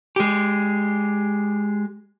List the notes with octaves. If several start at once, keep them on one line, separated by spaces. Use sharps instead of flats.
G#3 G4